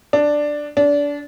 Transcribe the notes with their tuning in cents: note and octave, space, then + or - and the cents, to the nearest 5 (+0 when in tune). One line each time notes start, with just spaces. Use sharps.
D4 +5
D4 -25